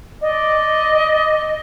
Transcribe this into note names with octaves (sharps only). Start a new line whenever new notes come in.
D5 D#5